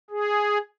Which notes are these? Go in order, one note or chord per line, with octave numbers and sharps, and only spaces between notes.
G#4